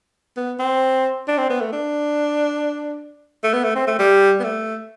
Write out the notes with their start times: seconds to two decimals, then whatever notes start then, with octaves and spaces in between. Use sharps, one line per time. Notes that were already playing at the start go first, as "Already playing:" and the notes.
0.37 B3
0.60 C4
1.28 D4
1.38 C4
1.50 B3
1.61 A3
1.73 D4
3.44 A3
3.54 B3
3.64 A3
3.76 C4
3.87 A3
3.99 G3
4.40 B3
4.44 A3